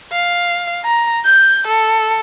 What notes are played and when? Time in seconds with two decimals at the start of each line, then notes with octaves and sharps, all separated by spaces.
0.12 F5
0.85 A#5
1.25 G6
1.67 A4